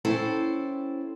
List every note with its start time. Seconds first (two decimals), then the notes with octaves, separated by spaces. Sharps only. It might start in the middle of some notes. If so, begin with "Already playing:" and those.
0.05 C#4 E4 A4 C5 G5